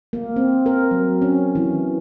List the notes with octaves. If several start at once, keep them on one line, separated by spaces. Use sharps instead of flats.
A#3
C4
A#4
F#3
C#4
E3